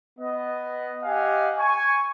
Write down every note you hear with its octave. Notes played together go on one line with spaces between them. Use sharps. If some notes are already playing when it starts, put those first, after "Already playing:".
B3 D#5
G4 D#5 F5 F#5 G#5
G#5 C#6